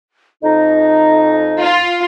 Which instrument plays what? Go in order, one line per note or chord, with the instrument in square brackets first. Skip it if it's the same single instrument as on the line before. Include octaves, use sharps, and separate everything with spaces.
[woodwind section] F2 D#4 [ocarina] D#5
[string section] F4